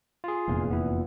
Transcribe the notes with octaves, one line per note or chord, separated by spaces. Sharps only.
F4 G#4
F1 E2 A#2
B3 E4